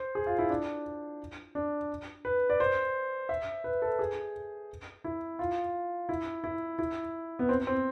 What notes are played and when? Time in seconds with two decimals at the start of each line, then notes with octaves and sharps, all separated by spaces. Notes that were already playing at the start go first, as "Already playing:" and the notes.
Already playing: C5
0.15 G#4
0.27 F4
0.39 E4
0.50 D4
1.55 D4
2.25 B4
2.50 D5
2.60 C5
3.29 E5
3.64 B4
3.82 A4
3.99 G#4
5.04 E4
5.39 F4
6.09 E4
6.44 E4
6.79 E4
7.39 B3
7.49 C4
7.67 C4